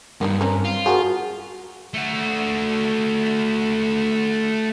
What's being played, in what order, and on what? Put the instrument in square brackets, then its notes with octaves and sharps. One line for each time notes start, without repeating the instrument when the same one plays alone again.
[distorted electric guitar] G2 [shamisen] A#3 B3 D#4
[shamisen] C4 C#4 A#4
[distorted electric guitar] F4
[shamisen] F3 A#4 [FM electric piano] F#4 G#4
[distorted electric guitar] A3 F#4